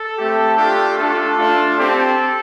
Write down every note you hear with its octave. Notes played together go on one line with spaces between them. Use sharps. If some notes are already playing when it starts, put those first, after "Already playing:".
Already playing: A4
A3 C4 G4
A3 D4 F4 G4
A3 D4 F4 A4
A3 D4 F4
C4 G4 A4